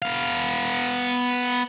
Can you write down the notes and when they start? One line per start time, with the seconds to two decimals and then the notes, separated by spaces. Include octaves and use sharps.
0.02 B3 F5